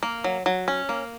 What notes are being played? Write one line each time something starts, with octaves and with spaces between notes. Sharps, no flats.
A#3
F#3
F#3
C#4
A#3